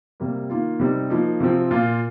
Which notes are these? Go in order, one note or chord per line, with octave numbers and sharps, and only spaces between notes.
C3 G3 A#3
D#3 A#3 F4
C3 G3 C4 D#4
F3 A#3 D#4
C3 F3 C4
A#2 A#3 F4